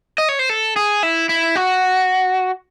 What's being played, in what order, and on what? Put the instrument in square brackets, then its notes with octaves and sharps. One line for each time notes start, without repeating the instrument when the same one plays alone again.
[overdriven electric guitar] D#5
C#5
C5
A4
G#4
E4
E4
F#4